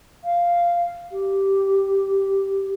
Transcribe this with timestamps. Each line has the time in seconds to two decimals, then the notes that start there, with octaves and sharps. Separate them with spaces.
0.24 F5
1.12 G4